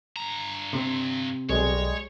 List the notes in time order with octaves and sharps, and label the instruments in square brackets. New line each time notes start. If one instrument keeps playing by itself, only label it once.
[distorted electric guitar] G2 A#5
[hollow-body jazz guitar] C3 C4
[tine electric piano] B1 [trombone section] G3 G#3 [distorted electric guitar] C#5